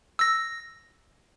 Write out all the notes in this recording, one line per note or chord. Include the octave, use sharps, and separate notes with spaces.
E6 A#6